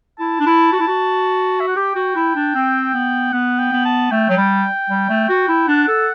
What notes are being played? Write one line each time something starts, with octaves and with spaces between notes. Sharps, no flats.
E4 A5
D4
E4
F#4
E4
F#4
E5
F#5
G4 G5
F#4
E4
D4
C4
B3
B3 F#5
G5
B3
A5
A3 G5
F#3
G3
G3
A3
F#4
E4
D4 F#5
A4